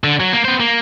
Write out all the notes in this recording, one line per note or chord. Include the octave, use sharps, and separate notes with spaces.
D3
F#3
A#3
B3 C5
A#3